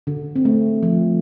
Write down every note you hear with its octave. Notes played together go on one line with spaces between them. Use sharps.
D3
C4
A3
F3